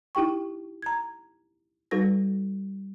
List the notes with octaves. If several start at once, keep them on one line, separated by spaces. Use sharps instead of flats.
D#4 E4 G4 G5 C#6
A#5 G#6
G3 D#4 F#4 A4 B4 A#6